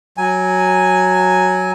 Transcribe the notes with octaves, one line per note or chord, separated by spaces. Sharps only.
F#3 G#5